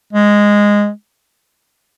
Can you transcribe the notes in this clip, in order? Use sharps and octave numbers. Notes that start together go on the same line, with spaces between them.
G#3